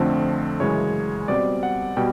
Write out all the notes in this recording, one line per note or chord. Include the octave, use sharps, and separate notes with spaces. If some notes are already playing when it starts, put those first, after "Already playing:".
Already playing: F2 D3 F3 A3 C4
F#2 C#3 E3 G#3 C#5
B2 G3 C4 D5
F#5
B2 G3 G5